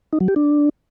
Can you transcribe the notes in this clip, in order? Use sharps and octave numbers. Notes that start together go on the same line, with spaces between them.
D#4
F#3
G4
D4